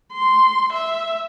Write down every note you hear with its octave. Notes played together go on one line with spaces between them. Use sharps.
C6
E5